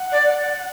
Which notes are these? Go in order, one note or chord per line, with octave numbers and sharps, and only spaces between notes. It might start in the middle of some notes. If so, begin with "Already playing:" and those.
Already playing: F#5
D5